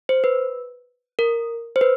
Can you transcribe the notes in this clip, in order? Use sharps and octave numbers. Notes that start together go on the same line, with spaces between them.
C5
B4
A#4
C5
B4